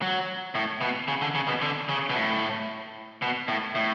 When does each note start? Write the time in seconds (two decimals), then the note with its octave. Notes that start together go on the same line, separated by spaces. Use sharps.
0.02 F#3
0.55 A2
0.81 B2
1.08 C#3
1.22 D3
1.35 C#3
1.48 B2
1.62 D3
1.89 C#3
2.10 B2
2.15 A2
3.22 B2
3.48 A2
3.75 A2